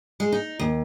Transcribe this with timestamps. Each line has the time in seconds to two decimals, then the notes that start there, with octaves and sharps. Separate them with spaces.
0.20 G#3
0.32 D#4
0.60 D#2